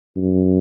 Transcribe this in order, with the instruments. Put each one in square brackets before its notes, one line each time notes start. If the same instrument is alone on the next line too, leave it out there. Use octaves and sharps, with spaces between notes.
[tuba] F#2